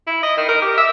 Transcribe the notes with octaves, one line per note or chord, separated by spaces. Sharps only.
E4
D#5
D#3
A#4
G4
E5